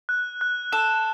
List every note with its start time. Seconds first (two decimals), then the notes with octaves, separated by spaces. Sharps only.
0.09 F#6
0.41 F#6
0.72 A4 E7